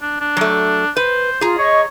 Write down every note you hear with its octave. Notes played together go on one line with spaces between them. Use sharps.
D4
D4
F#3 A3
B4 C5
F4 G#4 A#5
C#5 D#5 C#6